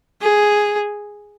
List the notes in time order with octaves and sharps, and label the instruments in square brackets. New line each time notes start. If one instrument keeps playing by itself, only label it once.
[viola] G#4